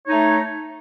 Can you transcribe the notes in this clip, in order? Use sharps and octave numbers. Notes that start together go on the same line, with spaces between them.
A3 D#4 C#5